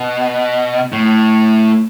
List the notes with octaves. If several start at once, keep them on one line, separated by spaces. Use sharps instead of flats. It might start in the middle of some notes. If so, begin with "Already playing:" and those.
Already playing: B2
A2